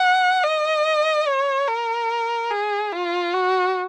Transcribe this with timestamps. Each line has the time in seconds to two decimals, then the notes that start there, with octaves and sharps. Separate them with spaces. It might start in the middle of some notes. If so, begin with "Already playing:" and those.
Already playing: F#5
0.43 D#5
1.27 C#5
1.68 A#4
2.51 G#4
2.92 F4
3.34 F#4